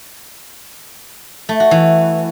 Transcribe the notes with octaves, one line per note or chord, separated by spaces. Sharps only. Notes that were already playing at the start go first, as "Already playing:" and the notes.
A3
F#4
E3